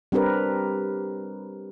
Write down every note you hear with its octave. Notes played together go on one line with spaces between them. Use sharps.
G3 C4 D4 G4 A#4 B4